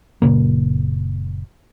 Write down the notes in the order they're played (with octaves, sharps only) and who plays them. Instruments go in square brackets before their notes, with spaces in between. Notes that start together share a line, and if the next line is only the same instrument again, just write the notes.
[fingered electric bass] F#1 A#2 C#3 A#3